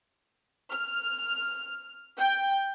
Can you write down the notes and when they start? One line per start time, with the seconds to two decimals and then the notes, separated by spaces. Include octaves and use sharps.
0.72 F6
2.18 G5